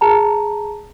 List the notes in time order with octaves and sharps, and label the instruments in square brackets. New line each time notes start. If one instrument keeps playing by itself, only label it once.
[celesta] G#4 A5 A#5